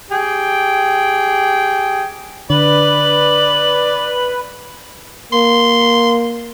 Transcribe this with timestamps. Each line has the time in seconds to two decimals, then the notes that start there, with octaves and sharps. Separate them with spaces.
0.11 G4 G#4 G5
2.50 D3 B4 D5 F#7
5.33 A#3 C6